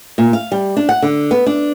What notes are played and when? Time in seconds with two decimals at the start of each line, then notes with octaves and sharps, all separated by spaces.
0.18 A#2
0.33 F5
0.52 G3
0.77 D4
0.89 F#5
1.02 D3
1.31 B3
1.46 D4